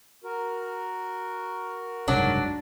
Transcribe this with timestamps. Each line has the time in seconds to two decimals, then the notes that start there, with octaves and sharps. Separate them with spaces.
0.24 F#4 A#4
2.08 F#1 C2 G#2 F#3 D4